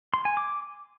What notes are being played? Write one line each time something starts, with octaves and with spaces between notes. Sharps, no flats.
C6
G#5
D6